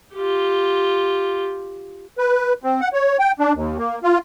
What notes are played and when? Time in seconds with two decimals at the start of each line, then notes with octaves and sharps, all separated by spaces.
0.15 F4 G4
2.18 B4
2.63 C4
2.81 F#5
2.93 C#5
3.19 G5
3.39 D4
3.55 D#2
3.78 A#3
4.03 F4